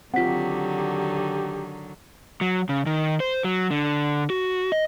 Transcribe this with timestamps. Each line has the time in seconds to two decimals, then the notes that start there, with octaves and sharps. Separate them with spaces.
0.14 D3 D#3 F#3 C4 F4 G4 F#5 B6
2.41 F#3
2.69 C#3
2.86 D#3
3.20 C5
3.44 F#3
3.71 D3
4.30 F#4
4.72 D#5